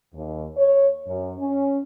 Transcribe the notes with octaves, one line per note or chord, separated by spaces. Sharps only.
D#2
C#5
F#2
C#4